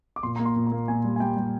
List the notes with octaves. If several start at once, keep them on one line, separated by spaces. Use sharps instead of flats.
D6
A#2 C6
A#3 A#5
C6
A#2
A#5
A#3
A#2 G#5
G3
G#5
G3 G5
G3